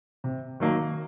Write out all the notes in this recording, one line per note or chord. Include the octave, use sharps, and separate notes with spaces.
C3
D#3 F#3 A#3